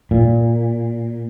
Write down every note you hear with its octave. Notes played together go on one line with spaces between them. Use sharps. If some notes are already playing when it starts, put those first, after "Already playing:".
A#2